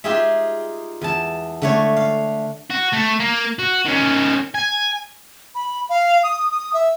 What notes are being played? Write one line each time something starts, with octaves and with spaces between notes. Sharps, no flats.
D#4 F4 G4 G#4 D#5 E5
E2 G#5 A5
D3 A3 C#5
F5
F#4
A3
A#3
F#4
D#3 C#4
G#5
B5
F5
D#6
D#6
E5